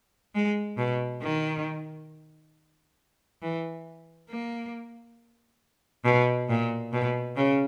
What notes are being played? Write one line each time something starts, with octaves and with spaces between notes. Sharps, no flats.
G#3
B2
D#3
E3
A#3
B2
A#2
B2
C#3